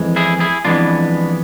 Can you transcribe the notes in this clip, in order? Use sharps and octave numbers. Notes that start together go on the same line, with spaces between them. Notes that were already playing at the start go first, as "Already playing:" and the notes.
Already playing: F2 E3 G#3
E4 G#4
E4 G#4
F2 E3 G#3 B3 D4 F4